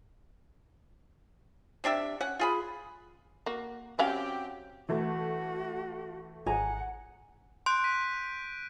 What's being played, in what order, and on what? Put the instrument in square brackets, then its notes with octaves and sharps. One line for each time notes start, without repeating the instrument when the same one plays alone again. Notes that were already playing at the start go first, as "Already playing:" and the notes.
[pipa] C3 D4 G4 E5
C#4 F#5
F4 G#4 B5
[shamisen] A#3 F#4
[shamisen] F#3 C#4 F5 [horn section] C4 F#4 G4
[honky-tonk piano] E3 A3 [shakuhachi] F#4
[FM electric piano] G#1 [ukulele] G#4 A#5 [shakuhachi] F#5
[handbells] C6 [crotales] F#6 G6 D7
[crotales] B6 D#7